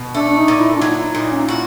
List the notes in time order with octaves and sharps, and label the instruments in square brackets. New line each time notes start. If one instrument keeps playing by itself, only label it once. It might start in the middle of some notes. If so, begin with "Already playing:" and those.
Already playing: [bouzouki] B2
[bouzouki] A3 [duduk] D4
[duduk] D4
D#4
[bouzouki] A#2
[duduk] E4
D4
[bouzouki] F#3 [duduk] D#4
[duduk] E4
[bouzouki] A#2 [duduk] D#4
[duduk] C#4
[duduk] E4 [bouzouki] F#4